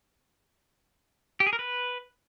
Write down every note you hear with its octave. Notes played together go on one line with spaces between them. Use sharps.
G4
G#4
A#4
B4